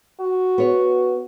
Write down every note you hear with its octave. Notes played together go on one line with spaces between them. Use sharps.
F#4
B3 C#5